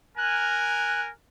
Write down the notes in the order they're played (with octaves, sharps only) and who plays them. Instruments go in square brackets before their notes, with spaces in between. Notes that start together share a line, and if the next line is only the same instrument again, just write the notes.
[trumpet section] A#4 G#5 [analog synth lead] F#6